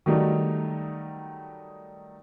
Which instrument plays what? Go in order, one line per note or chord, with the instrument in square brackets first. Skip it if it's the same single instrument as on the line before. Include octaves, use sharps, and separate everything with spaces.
[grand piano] D#3 F#3 G3 A3 D#4